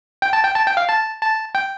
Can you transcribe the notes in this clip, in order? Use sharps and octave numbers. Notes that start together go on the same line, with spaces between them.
G5
A5
G5
A5
G5
F5
A5
A5
G5